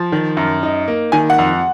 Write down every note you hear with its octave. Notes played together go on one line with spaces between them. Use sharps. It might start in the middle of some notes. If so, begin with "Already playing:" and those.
Already playing: F3
D#3
F#2
D#4
A#3
D#3 G#5
F#5
F2